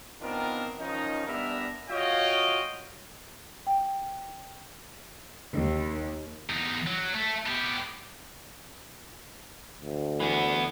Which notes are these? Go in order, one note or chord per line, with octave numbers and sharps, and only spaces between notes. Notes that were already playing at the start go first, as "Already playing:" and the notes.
D#3 B3 C4 D4 F4 A#4
D#3 F3 C#4 D#4
G3 B3 D4 A#4 E5
F4 F#4 C#5 D#5 F5 G5
G5
D#2
E2 D#4
F#3
A3
B3 G4
D2
E3 B3